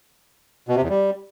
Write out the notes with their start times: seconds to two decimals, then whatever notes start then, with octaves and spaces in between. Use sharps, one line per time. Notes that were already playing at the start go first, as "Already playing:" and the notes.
0.69 B2
0.76 C3
0.83 E2
0.89 G3